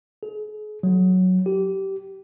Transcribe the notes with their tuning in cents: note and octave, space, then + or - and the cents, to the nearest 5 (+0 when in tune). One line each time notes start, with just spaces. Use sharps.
G#4 +35
F#3 -5
G4 -20